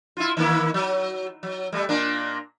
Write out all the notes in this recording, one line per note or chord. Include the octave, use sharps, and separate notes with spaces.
E4 F4
D#3 A#3 E4
F#3
F#3
G3 A3
A#2 A#3 D4